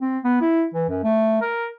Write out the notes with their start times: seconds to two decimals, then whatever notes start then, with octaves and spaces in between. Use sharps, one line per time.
0.02 C4
0.24 B3
0.41 E4
0.74 E3
0.89 F#2
1.04 A3
1.42 A#4